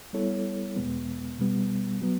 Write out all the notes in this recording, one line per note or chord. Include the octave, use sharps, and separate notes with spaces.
G3 B3 E4 A4 C#5
E2 B2 G#3 B3
B2 G3 B3
F#3 B3